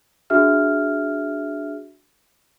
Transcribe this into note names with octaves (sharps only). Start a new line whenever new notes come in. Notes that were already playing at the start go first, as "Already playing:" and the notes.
D4 F#4 G#4 E5 F6